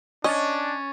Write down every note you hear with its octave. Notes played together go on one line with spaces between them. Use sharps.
C#4 D4 D#5 C#6 A6